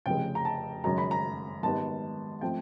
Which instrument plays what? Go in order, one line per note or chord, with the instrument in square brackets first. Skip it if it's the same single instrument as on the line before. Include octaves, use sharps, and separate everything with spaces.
[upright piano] F1 F2 C#3 G5
A#5
A5
G#1 F#2 C#3 A#5
B5
A#5
G#1 G#2 D#3 G3 B3 A5
F3 A3 C4 G5